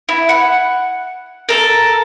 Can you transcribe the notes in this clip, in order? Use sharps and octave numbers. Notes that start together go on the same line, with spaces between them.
E4
F#5
A4 A#4